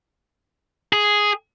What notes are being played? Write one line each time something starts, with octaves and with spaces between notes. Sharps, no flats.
G#4